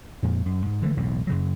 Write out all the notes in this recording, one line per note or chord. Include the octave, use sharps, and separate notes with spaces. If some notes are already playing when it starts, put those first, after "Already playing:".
F2 A#2
F#2
G#2
D3 E3 F3 A3
E1 B1 A2
F#2 C#3 F#3